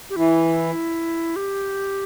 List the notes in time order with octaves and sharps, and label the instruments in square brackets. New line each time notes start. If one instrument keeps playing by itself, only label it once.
[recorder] G4
[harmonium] E3 [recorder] E4
[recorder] G4